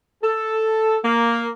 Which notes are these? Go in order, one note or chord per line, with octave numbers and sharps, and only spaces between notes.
A4
A#3